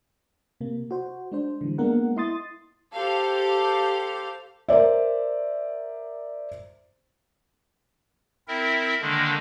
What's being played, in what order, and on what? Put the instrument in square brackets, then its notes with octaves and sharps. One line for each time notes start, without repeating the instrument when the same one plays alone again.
[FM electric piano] C3 A#3
F#4 C5
G#3 D4 C5
D3 E3 G3
G#3 A#3 B3 D4 A#4 F#5
E4 D#5 C6 D#6 A6
[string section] G4 A4 C5 F5
[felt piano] A#4 C5 D5 E5
[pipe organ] C4 E4 A#4 E5
D3 D#3 G#3 A#3 D4